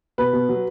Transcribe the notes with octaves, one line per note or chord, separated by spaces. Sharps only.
B2 B4
B2
F#3